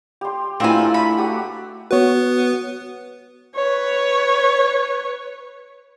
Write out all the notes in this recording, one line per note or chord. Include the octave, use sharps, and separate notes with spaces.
G4 C6
A3 C4 D4 E4 F4 A#4 B4 G#5
A4
E5 B5
F#4 G4 F#5
B3 F#4 B4 C#5
B4 C#5